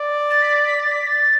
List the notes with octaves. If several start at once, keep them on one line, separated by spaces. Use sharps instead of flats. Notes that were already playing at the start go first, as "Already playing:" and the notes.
Already playing: D5
A6
B6
A6
B6
A6
B6
B6
A6